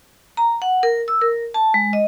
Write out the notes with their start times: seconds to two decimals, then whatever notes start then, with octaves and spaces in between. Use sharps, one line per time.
0.37 A#5
0.62 F#5
0.83 A#4
1.08 E6
1.22 A#4
1.54 A5
1.74 G#3
1.93 D#5